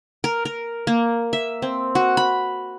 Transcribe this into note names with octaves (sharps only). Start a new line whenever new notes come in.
A#4
A#4
A#3
E5
C4
F#4
B5